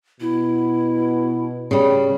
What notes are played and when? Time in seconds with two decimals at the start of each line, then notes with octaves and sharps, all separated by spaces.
0.21 B2 E4
1.71 C#3 G3